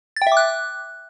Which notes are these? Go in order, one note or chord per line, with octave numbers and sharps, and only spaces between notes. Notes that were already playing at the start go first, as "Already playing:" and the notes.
A6
G5
E5
D6
F#6